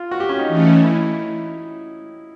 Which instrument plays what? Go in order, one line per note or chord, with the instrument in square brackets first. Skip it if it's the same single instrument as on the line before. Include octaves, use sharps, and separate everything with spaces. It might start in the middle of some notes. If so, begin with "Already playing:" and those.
Already playing: [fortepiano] F4
F#4
G4
C#4
D#4
[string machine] E3 A3 C#4
[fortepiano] E4